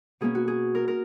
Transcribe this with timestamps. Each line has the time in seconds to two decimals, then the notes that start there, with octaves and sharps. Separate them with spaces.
0.21 B2 A#3 C#4 G#4
0.35 F#4
0.48 G#4
0.75 A#4
0.88 A#4